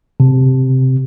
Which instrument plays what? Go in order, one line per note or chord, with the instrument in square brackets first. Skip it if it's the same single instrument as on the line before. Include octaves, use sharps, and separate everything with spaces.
[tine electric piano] C3